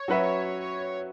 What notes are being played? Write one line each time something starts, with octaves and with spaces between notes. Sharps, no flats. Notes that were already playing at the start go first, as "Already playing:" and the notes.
Already playing: C#5
F#3 C#4 F#4 B4 E5